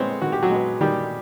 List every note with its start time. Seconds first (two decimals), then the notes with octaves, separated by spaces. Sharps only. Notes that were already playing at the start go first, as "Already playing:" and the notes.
Already playing: G#3 B3 C4 C5 C#5
0.21 D#3 F#4
0.32 G4
0.43 F#3 F#4
0.50 G#3 B3
0.81 D#3 G3 G4